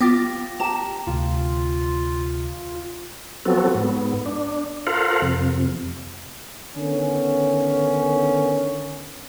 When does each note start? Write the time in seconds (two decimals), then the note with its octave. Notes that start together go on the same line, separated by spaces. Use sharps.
0.01 B3 F4 G4 D6 A6 A#6
0.60 G4 A5 A#5 E7
1.07 D2 C3 F4
3.45 F3 F#3 B3 C4 F#4 A4
3.75 G#2 B3
4.26 D4
4.87 F4 A4 A#4 C5 F5 F#5
5.22 F2 C3
6.75 D3 D#3 B3 C#4